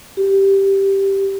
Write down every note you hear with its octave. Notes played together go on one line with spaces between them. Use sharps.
G4